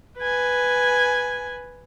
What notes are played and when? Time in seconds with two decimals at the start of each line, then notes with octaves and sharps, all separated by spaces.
0.19 B4 G#5